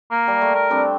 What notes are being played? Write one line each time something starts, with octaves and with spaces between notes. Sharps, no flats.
A#3
G3
A3
A#4
G3 C4 D4